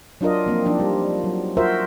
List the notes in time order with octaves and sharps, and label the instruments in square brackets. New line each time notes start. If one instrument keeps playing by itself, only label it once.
[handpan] F#3 D4 F4 A#4 D#5
F3 A#3 C4
F3 D4 D#4
G3
F#3
F4 F#4 A#4 C5 E5